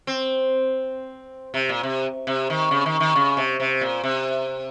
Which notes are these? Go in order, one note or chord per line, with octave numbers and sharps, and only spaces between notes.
C4
C3
A#2
C3
C3
D#3
C#3
D#3
D#3
C#3
C3
C3
A#2
C3